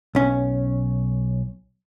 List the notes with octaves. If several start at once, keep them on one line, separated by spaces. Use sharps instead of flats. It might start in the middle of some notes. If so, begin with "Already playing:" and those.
B1 C#4